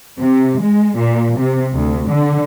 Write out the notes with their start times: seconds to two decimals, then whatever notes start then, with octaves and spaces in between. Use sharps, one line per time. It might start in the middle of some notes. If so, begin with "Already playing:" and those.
0.19 C3
0.62 G#3
0.97 A#2
1.39 C3
1.75 D2
2.10 D3